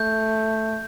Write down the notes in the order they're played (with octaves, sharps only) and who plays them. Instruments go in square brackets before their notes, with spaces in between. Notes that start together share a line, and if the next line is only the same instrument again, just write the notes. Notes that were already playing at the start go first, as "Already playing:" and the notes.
Already playing: [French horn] A3 [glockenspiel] G6